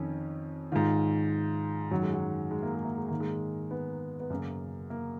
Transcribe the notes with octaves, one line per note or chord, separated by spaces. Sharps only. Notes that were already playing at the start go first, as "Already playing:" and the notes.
Already playing: F2 D#3 C#4
G#2 D#3 F4
F#2 D#3 F#3
G#3
F#3
G#3
A#3
G#3
A#3
G#3
G#2 D#3 A#3
G#3
B3
B3
F#2 C#3 A#3
A#3